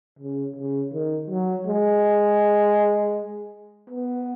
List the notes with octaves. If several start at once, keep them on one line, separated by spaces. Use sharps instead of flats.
C#3
C#3
D#3
F#3
G#3
B3